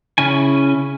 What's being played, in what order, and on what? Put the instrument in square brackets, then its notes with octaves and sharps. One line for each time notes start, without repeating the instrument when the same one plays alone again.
[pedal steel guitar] C#3 C#4 E4 G#5